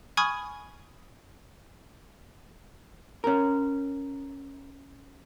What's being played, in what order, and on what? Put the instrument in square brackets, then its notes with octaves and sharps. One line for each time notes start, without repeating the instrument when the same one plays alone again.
[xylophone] G#5 B5 C#6 D#6 F6 G#6
[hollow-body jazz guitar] C#4 A#4